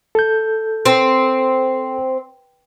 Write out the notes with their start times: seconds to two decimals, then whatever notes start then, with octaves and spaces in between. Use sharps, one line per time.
0.15 A4 G6
0.86 C4